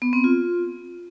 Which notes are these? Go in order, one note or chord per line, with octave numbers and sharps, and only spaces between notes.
B3
C4
F4